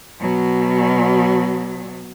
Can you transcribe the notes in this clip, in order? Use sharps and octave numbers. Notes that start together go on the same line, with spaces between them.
B2 F#3